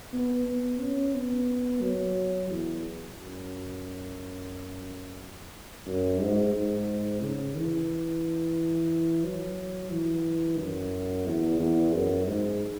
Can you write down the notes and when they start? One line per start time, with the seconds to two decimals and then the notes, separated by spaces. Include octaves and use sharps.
0.14 B3
0.47 B3
0.81 C#4
1.15 B3
1.82 F#3
2.50 E2
3.17 F#2
5.86 F#2
6.21 G#2
6.54 G#2
7.22 C#3
7.56 E3
9.24 F#3
9.91 E3
10.59 F#2
11.27 E2
11.59 E2
11.94 F#2
12.27 G#2